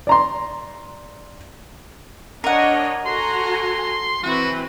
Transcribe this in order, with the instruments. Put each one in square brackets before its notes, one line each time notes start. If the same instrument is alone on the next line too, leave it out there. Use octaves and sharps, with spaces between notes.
[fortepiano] D5 A#5 C6
[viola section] D4 C#5 D#5 [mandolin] A#4 F#5
[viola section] F#4 G#5 A#5 [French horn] A4 [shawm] C6
[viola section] E3 C4 B4 [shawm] F#4